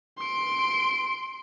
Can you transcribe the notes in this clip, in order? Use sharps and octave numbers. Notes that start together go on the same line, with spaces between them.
C6 D7